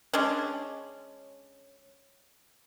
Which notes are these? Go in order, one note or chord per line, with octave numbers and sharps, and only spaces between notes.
G#3 C#4 D4